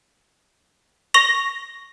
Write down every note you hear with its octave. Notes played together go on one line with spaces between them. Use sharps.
C#6 A#6 F7